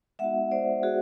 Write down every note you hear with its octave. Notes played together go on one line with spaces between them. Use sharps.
G#3 B3 D#4 F#4 E5 F#5
C5 D5
F#4 G#4